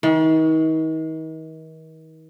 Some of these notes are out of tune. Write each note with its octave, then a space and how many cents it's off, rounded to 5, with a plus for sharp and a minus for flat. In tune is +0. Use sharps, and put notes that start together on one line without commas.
D#3 +40